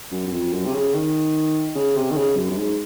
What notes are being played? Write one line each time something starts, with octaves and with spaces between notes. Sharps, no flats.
F#2
F#2
F2
F#2
C3
C#3
D#3
C#3
C3
D#3
C#3
F#2
F#2
G#2